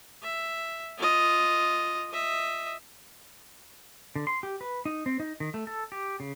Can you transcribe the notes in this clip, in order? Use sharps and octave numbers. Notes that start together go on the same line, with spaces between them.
E5
F4 D#5
D#5 E5
D3
C6
G4
B4
D#4
C4
D#4
D#3
A3
A4
G4
C#3